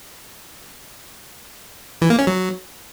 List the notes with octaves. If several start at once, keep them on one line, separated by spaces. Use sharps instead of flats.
E3
A#3
C#4
F#3